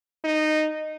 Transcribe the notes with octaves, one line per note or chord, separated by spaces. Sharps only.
D#4